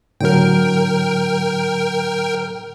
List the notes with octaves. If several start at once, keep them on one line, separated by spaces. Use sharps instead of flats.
A2 D3 F#3 A#4 G5